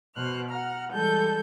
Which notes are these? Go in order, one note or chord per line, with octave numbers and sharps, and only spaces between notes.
B2 C5 F6 F#6
F#5 A#5 F6
E3 G3 G#3 A4 G6